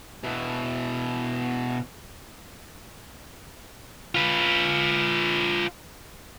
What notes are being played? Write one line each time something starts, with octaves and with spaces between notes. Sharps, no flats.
B2 E4
F4 B4